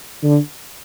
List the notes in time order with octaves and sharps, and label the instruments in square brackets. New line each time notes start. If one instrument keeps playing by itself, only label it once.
[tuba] D3